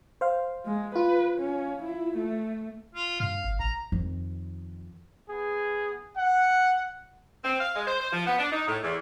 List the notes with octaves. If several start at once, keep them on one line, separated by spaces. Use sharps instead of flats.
C5 F5
G#3
F4 B4
C#4
E4
A3
F4
G2 F5
G1
A1 A#5
F2 D#3
B3 G#4
F#5
C4
F5
G#3
C5
C5
F3
B3
D4
D#4
A2
E2